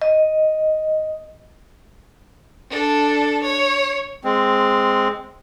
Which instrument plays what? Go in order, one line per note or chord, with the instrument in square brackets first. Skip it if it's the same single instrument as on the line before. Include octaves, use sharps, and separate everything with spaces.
[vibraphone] D#5
[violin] D4 A4
C#5
[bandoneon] G#3 C4